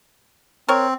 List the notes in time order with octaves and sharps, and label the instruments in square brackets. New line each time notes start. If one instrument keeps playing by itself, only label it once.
[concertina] C4 [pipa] A#4 C#5